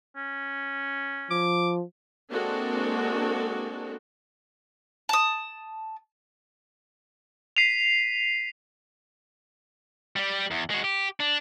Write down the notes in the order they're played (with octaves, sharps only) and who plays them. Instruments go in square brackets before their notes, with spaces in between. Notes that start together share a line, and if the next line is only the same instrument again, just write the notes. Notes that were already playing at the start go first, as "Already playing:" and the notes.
[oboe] C#4
[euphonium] F3 [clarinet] D6
[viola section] G#3 A#3 C4 D4 F#4 A4
[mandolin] A5 D#6
[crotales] B6 C7 D#7 F7
[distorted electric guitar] G3 G4
E2
G#3 F#4
G4
D4